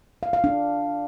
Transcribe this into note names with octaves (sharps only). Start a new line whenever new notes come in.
F5
F5
D4